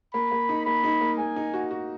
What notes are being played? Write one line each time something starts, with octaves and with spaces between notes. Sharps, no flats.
A#3 B5
A#3
D#4
A#3 B5
D#4
A#3
A#3 G#5
D#4
F#4
F#4